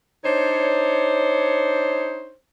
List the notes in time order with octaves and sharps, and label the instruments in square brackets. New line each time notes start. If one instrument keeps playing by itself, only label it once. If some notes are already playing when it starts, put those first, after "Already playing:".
[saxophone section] D4 D#4 C5 C#5